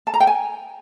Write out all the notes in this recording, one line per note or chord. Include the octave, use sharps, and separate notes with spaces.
A5
A#5
G5
G#5